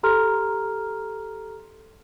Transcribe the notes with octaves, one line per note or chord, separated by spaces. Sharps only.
G4 A4 A#5 C6 F6